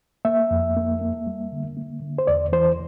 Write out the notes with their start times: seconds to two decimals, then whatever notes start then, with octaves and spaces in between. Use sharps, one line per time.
0.25 A#3 E5
0.51 F2
0.76 A#3
1.01 A#3
1.27 G3
1.52 D3
1.77 A#3
2.02 D3
2.18 C5
2.27 E2 D5
2.53 E3 C5